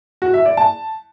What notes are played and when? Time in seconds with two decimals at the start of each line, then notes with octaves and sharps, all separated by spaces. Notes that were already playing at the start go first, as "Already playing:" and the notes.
0.22 F#4
0.34 E5
0.45 D5
0.57 A5